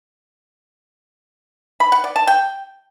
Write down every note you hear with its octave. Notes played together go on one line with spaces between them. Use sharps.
B5
F#5
D5
A5
G5